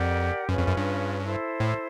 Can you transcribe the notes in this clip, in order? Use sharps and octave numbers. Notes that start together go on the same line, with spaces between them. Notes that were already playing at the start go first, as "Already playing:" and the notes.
Already playing: F2 G4 A#4 D5 F#5
F#2 C#4 F4 G#4 B4
F2
F#2
G2
E4 A4 C5
A2